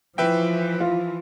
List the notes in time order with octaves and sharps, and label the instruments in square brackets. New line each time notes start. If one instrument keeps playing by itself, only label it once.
[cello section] E3 [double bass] F3 [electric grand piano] B4 E5 G5
[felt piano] F4